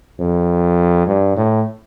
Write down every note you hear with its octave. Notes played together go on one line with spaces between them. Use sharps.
F2
G2
A2